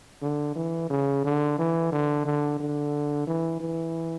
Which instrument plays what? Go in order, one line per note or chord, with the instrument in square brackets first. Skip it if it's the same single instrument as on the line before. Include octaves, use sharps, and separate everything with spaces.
[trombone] D3
E3
C#3
D3
E3
D3
D3
D3
E3
E3